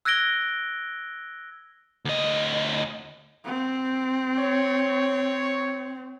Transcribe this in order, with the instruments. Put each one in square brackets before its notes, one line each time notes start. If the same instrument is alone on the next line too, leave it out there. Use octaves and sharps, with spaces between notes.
[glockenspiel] E6 F#6 G#6 A#6 D7 G7
[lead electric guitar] D2 D#5
[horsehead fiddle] C4
[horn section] C#5